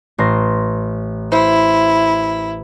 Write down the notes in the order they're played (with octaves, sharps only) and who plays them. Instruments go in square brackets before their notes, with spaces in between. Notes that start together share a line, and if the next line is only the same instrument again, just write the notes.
[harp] A1 C6 A#6
[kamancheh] E4 [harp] C5